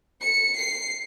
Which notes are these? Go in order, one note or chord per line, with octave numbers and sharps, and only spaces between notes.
C#7
C7